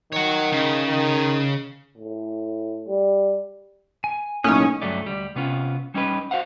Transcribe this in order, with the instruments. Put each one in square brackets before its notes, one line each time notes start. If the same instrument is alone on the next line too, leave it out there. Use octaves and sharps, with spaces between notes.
[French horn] D#3 [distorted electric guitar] C#5 F#5
[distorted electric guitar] C#3
[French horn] D#3
[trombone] A2
G3
[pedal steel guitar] G#5
[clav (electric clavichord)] B1 A2 [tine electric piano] A#3 D#4 [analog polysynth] C#4 [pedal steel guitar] G#5 D#6
[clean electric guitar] D2 G2 F#3 A3 C#4 D5
D2 G3
C3 B3 C#4 F4
G3 C#4 D#4 G4 B4
F#4 C5 F5 F#5